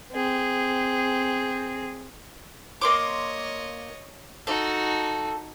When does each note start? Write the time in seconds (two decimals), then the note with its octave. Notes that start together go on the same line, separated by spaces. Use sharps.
0.12 C4 G#4
2.81 A#3 C#5 D#5 C6 D6
4.47 D#4 F#4 A4